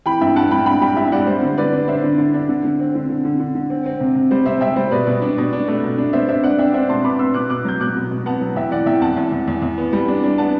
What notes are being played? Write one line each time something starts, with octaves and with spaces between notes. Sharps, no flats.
E3 G5 B5
G2 E5 G5
G2 F#5 A5
G2 G5 B5
G2 G5 B5
G3 G5 B5
G2 E5 G5
E5
G3 D5 F#5
G3 C5
D3 C5
D3 B4 D5
D4
D4 C5 E5
D3
D3
D4
D3
D3
C4
D3
D3
D3
D3
D3
C4
C4
C3
C3
G3 C5
C3 C5 E5
C3 E5 G5
G3 C5
B2 B4 D5
B2
D4
B2
D4
A3
B2
D4
B3 C5 E5
D4 C5 E5
D4 D5 F#5
D4 E5 G5
D4 C5 E5
B2 A5 C6
B3 B5 D6
B3 C6 E6
B2 D6 F#6
B2 D6 F#6
F#3 G6
B2 D6 F#6
B2
B2
B3 F#5 A5
F#3
E2 E5 G5
E3 D5 F#5
E2 E5 G5
E2 F#5 A5
E2
E2
E2
E2
B3
G3
D4
D4
B3 F#5 A5